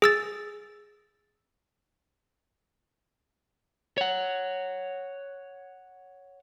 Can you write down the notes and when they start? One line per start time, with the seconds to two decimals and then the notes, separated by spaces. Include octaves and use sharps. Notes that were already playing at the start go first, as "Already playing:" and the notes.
0.02 G#4 E6 A6
3.98 C#5 F#5